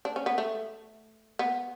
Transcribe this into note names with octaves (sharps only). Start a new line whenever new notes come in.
D4
C#4
B3
A3
B3